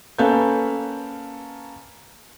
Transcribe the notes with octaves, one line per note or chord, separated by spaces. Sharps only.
A#3 C#4 A4 B4 F5 G6